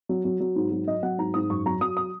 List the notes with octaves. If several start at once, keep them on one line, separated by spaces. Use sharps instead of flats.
F#3
F#3
F#3
G#2
F#3
F#3 D#5
F#3 F#5
G#2 A#5
G#2 D#6
F#2 C#6
F#3 A#5
F#3 D#6
D#6